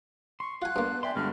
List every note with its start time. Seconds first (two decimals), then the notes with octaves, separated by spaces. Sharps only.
0.40 C6 C#6
0.62 F4 F#5 G#5 F#6
0.76 G2 A#3 B3 D4
1.03 D5 E5 G5 G#5 C6
1.15 G2 D3 G#3 B3 F#4 F6